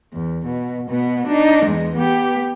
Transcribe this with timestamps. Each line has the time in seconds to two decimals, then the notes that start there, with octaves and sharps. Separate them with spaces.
0.13 E2
0.46 B2
0.89 B2 B3
1.27 D4 D#4
1.66 E2 G#3
1.96 B3 G4